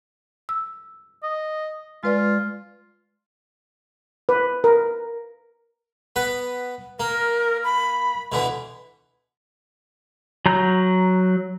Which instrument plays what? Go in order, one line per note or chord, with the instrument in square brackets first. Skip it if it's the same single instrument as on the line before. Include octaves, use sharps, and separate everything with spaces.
[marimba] E6
[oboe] D#5
[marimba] G#3 B4 D5 [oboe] F4
[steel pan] B4
A#4
[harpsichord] B3 B4
[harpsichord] A#3 [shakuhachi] A#4
[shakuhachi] B5
[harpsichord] B2 D3 E3
[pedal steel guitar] F#3 A#5 G6